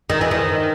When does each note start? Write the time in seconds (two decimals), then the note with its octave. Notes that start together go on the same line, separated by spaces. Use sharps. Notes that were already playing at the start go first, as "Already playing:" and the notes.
0.10 D#3
0.21 E3
0.31 D#3